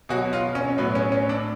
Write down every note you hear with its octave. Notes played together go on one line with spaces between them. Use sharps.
B2 F#3 F#4
F4
C#4
A2 F#3 B3
C#4
C#4
D4